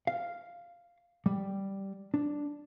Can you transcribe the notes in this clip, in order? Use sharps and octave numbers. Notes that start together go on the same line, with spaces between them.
F5
G3
D4